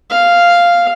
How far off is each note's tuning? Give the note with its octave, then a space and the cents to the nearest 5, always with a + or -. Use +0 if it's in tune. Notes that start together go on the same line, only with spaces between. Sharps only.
F5 -5